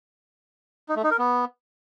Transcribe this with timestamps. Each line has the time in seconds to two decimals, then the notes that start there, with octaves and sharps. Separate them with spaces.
0.89 D#4
0.96 A3
1.04 D#4
1.11 A#4
1.18 B3